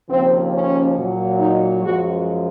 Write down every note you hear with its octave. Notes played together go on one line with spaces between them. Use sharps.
D#2 C#3 F3 C4
C#4
A#2 F#3
D#4
F#2 F3 G#3 F#4